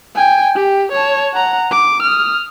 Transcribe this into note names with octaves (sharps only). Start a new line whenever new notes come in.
G5 G#5
G4
C#5 A5
F#5 A#5
D6
D#6 F6